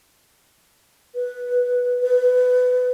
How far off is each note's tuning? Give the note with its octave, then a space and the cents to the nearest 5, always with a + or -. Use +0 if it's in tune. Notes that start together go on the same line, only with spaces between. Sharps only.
B4 -5
B4 +20